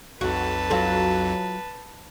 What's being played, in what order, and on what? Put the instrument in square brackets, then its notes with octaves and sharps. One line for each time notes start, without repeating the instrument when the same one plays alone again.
[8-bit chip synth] B1 F2 [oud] F#4 [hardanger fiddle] B4 A5
[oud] F#3 F4 A4